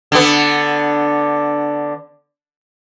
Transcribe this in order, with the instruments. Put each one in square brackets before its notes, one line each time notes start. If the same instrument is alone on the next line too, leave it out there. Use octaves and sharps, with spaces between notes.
[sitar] D3 B3